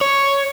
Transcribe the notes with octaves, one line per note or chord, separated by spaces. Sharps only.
C#5